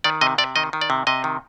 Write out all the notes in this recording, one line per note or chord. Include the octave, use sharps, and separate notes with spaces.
D#3 D5
C3 D#5
C3 D5
D#3 D#5
D#3
D5
C3
C3 D#5
D#3